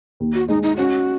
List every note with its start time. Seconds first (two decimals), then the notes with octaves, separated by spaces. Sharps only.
0.20 D#2
0.34 F#4
0.49 G#3 D#4
0.63 D#4
0.77 C#4 F#4